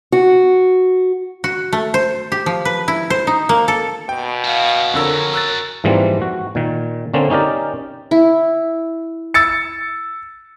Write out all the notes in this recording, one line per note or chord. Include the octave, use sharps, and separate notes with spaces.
F#4
F#4
A3
C5
G4
F3
B4
E4
C5
D#4
A#3
A4
B2 G5
F#4 G#4 F5
F2 D3 A#4 C#5 E6
E6 F#6 A6
G#2 E3 F3 G3 A#3 C4
F#4
A#2 D#3
D3 A#3 C4 C#4
C#4 D#4 G4 A#4 D5
E4
E6 A6 C#7